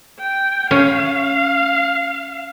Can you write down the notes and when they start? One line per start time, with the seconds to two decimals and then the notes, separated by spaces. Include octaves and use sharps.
0.20 G5
0.71 C#4 F5